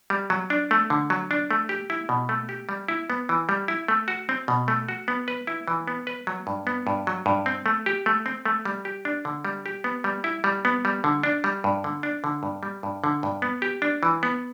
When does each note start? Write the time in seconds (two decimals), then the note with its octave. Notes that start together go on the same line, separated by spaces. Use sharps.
0.10 G3
0.30 F#3
0.50 D4
0.71 A3
0.90 D3
1.10 F#3
1.31 D4
1.51 A3
1.69 G4
1.90 E4
2.09 B2
2.29 A3
2.49 G4
2.69 G3
2.88 E4
3.10 B3
3.29 E3
3.49 G3
3.68 E4
3.88 A3
4.08 F#4
4.29 C4
4.48 B2
4.68 A3
4.88 F#4
5.08 B3
5.28 B4
5.47 E4
5.68 E3
5.88 B3
6.07 B4
6.27 F#3
6.47 G2
6.67 B3
6.87 G2
7.07 F#3
7.26 G2
7.46 C4
7.66 A3
7.86 G4
8.06 A3
8.26 C4
8.45 A3
8.65 G3
8.85 G4
9.05 D4
9.25 D3
9.45 G3
9.66 G4
9.84 B3
10.04 G3
10.24 E4
10.44 G3
10.65 B3
10.85 G3
11.04 D3
11.23 D4
11.44 G3
11.64 G2
11.84 D3
12.03 D4
12.24 D3
12.43 G2
12.63 G3
12.83 G2
13.04 D3
13.23 G2
13.42 B3
13.62 G4
13.82 D4
14.03 E3
14.23 B3